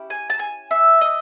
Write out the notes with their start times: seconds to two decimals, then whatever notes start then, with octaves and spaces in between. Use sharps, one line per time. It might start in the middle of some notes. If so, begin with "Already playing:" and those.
Already playing: C#4 E4 G4
0.10 G#5
0.30 A5
0.39 G#5
0.71 E5
1.01 D#5